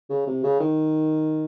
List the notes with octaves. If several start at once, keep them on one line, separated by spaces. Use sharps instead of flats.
C#3
C3
C#3
D#3